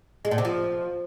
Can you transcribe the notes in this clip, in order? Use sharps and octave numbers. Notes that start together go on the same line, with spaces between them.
G#3
A2
C3
F3